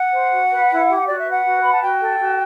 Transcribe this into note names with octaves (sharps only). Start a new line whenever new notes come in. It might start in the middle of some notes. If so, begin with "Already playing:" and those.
Already playing: F#5
C5
F#4
B4
E4
G4
F#4 D5
E5
B4
F#5
F#4
B4 B5
A5
F#4 G5
A4
F#4